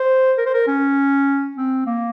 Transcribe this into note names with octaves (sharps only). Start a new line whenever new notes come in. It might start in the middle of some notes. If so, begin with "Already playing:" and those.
Already playing: C5
A#4
C5
A#4
C#4
C4
A#3